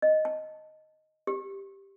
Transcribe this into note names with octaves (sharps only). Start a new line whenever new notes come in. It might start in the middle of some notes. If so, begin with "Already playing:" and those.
D#5
A5
G4